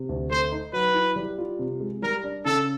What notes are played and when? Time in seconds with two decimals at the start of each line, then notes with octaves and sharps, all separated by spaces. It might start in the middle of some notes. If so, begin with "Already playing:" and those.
Already playing: C3
0.09 D2
0.30 A3 C5
0.52 D#4
0.73 F#3 B4
0.94 E4
1.16 G3
1.38 F4
1.59 C3
1.80 G#3
2.02 G3 A#4
2.24 D4
2.45 C#3 A4